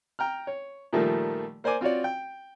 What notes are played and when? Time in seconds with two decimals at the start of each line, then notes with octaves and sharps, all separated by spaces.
0.19 G5 A#5 F6
0.47 C#5
0.93 A#2 D#3 F3 G3 A3 A#3
1.64 A#3 C5 D5 G#5 D6
1.81 C4 F4 F#4 C#5 D5
2.04 G5